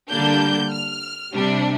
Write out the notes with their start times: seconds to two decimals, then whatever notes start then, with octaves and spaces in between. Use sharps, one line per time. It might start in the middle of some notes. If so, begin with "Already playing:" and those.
0.10 D3 G3 A#3 D4 G6
0.72 F6
1.33 C3 G3 D4